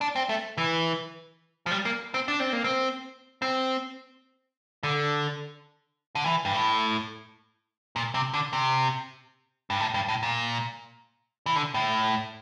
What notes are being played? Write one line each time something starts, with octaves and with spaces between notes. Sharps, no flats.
D4
C4
A3
E3
F3
G3
A#3
C4
D4
C4
A#3
C4
C4
D3
D3
E3
G2
A2
A#2
C3
D3
C3
G2
A2
G2
A2
A#2
E3
D3
A2